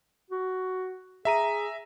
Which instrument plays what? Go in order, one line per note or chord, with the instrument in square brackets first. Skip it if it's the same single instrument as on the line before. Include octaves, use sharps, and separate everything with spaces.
[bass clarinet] F#4
[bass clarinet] G#4 [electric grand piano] E5 A#5 D#7